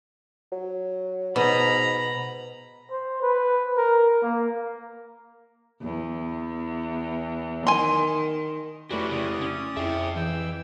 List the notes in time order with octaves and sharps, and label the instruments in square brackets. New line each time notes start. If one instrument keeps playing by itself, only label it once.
[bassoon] F#3
[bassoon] G#2 [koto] B2 [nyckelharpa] A#5 B5
[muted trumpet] C5
B4
A#4
A#3
[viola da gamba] E2
[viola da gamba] D#3 [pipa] G#5 C6
[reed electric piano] F2 A3 [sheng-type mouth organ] C#4 B4 D5 [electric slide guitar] E4 G4 [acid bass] F#4
[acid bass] C#3 [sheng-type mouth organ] D5 D#6
[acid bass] C#4
[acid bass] F2 [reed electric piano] E4 G#4 [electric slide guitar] E5 G5
[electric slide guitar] E3 [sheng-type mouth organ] G5 E6